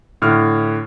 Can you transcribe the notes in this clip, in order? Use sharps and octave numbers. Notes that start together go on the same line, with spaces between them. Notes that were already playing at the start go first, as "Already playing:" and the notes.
A2 D3 F6